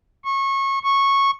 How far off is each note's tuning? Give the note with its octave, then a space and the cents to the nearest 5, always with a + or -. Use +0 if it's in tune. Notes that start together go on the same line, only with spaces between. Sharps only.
C#6 -25
C#6 -10